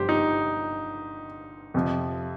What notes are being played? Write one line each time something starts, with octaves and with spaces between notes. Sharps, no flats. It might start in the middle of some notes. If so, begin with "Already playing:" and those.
Already playing: G1 G2 F3 G4 C5
D#4
F2 C3 F3